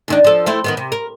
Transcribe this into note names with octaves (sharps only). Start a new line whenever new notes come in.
D#2 D#3 D4
F3 A4
A3 C4 E4
D#3 E3 B3
C3
A#4